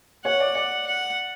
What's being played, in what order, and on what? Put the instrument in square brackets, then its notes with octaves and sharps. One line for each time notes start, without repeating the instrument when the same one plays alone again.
[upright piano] C#5 [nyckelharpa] F#5
[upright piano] D5
[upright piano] D5 [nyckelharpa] F#5
[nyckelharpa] F#5